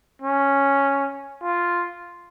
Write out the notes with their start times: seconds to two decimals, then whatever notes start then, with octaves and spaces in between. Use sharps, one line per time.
0.22 C#4
1.43 F4